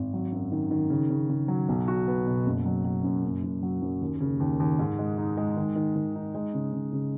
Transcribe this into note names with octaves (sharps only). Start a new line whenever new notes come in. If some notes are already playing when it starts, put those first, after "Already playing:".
Already playing: G#1
F#3
F#2
D#3
D#3
C#3
C#3
C#3
F#3
B1
F#4
B3
B2
F#1
F#3
F#3
F#2
F#1
F#2
F#3
F#2
D#2
C#3
D#2
D#2
G#2
G#3
D#4
G#3
D#3
D#3
D#3
D#4
G#3
C#3
C#3
C#3